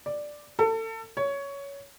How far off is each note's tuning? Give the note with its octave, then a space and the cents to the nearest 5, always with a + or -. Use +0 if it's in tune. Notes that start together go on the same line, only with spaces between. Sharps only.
D5 +5
A4 +30
C#5 +15